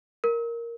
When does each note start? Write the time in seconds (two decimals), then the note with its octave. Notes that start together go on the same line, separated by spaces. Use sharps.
0.24 A#4